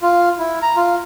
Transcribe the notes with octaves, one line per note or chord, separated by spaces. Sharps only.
F4
E4
A#5
F4